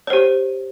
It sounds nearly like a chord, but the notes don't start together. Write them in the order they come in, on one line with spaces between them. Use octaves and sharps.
C#5 C5 G4